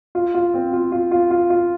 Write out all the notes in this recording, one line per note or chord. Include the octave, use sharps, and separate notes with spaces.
F4
F4
C4
F4
F4
F4
F4
F4